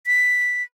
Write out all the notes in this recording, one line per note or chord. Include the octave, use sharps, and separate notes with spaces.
B6